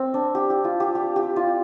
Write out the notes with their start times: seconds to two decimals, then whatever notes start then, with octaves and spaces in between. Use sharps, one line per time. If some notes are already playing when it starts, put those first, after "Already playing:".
Already playing: C4
0.14 D4
0.35 G4
0.50 G4
0.64 F4
0.80 G4
0.95 G4
1.16 G4
1.36 F4